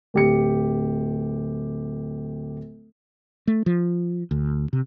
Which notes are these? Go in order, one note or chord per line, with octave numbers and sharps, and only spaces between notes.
D1 G4 C#7
A3
F3
D2
C3